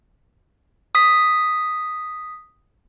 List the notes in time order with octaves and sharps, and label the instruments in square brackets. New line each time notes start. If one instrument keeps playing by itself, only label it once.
[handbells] D#6 B6